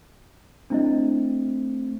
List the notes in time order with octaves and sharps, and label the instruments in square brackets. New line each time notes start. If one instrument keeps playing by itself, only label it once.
[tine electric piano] A3 C4 [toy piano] D4 E4 D#5